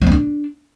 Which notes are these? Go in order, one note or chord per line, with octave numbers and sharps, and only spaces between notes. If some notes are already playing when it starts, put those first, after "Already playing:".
F3
C4
D4